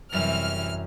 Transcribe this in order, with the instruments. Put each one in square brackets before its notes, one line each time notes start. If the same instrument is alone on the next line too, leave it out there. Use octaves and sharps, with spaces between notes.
[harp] F#2 G3 A#6 [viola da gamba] C3 E3 [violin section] F6